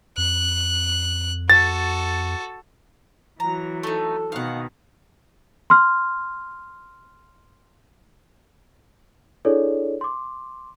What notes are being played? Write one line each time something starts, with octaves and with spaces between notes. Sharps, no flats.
F2 F#6
F#4 A4 A6
E3 F#3 A#5
A3 D#4 A4
B2 D#3 F5 F#5
C6 F6
D4 E4 G#4 A4 C#5 D5
C6 D6